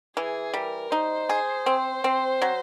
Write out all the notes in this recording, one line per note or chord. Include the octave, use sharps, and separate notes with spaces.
E3 G#4
G3 A#4
D#4 C5
G#4
C4
C4
F#3